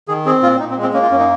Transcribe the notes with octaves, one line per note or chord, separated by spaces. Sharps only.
D#3 G#4
C4 G#4
A#2 F4
A#2 D#4
C4
G#3
C4
A#3 C#4
F4
F#2 C#4
D#4